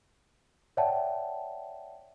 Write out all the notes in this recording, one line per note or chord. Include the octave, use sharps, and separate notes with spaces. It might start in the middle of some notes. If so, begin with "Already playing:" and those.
C#5 D5 E5 F#5 G5 A5